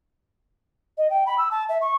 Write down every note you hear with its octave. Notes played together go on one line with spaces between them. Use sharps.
D#5
G5
B5
E6
A5
E5
C#6